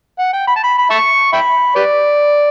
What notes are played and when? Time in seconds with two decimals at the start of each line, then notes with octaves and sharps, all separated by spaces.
0.19 F#5
0.33 G5
0.47 B5
0.56 A5
0.63 B5
0.78 B5
0.90 E5 A5 C#6
1.33 E5 G5 B5
1.76 G4 B4 D5